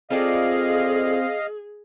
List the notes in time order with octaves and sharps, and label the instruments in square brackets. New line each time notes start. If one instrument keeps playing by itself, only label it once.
[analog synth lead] C4 [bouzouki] F4 A4 D5 [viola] G#4 [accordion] D#5 F5